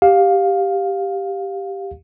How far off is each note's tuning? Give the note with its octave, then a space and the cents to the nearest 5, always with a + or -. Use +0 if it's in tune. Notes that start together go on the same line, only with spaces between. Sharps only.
G4 +0 F5 +15